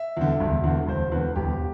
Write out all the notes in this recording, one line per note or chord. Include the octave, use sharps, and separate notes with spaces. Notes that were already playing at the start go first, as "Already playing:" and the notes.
Already playing: E5
E2 D3
E1
E2 D3
E1 C5
E2 D3 B4
E1 G4